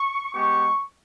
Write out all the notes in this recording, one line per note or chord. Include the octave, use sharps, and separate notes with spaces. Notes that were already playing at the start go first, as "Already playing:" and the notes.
Already playing: C#6
G#3 B3 G4 C#6